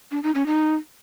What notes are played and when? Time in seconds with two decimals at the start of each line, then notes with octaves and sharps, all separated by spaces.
0.12 D4
0.23 D#4
0.35 C#4
0.47 D#4